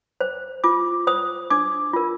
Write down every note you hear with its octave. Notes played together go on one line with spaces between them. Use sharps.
C5
F4 D6
C5 D#6
D4 D6
F4 A#4